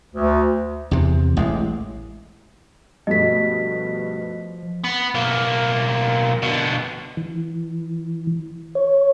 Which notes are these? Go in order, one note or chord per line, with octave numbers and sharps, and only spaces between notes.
D2
E2 C3
A1 G#3
G2 B2 F3 A3 D#5 B6
B3
B1 A#3
B2 D3
E3
C#5